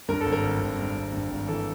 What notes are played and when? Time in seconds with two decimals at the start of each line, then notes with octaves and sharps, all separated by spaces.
0.09 G2 A#4
0.21 G#1 A4
0.32 A#4
0.43 G#1
0.61 G#1
0.78 G2
0.96 G#1
1.13 G2
1.31 G#1
1.48 E3 A4